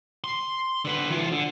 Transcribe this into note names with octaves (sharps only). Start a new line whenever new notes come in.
C6
D3 B4
E3 F4
D3